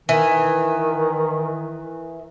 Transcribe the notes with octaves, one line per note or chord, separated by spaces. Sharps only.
D#3 E3